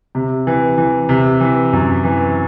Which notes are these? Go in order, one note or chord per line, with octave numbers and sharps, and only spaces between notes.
C3
E3
E3
C3
E3
F#2
E3